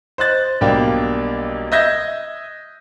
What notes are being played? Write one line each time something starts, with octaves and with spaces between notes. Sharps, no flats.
C5 D#5 F#6 A6
B1 G3 A#3 D4 G5
D#5 E5 G6 G#6 A#6